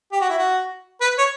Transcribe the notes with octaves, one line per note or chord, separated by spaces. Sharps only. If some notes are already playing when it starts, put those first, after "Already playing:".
G4
F#4
E4
F#4
B4
C#5